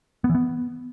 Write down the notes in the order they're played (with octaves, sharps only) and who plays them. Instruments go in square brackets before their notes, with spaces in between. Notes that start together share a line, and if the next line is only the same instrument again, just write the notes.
[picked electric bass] B3
E3
B3